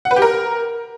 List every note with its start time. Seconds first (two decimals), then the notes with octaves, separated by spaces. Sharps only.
0.05 F#5
0.11 B4
0.16 G4
0.22 A#4